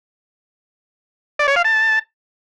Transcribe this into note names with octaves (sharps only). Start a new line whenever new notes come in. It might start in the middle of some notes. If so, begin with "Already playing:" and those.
D5
C#5
F5
A5